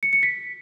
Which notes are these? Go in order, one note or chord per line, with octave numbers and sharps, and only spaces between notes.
C#7
C#7
B6